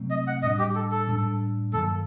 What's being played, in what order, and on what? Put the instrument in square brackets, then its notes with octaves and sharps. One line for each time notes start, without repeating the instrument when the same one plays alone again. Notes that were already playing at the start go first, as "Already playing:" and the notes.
Already playing: [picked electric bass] C3 F#3 A3 C4
[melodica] D#5
F#5
[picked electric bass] A2 G3 D4 [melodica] D#5
[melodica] G4
A4
A4
[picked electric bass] A2 G3 D4
[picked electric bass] G2 D#3 F#3 A#3 [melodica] A4